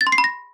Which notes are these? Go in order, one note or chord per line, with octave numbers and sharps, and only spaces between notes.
A6
C6
C7
B5
A#6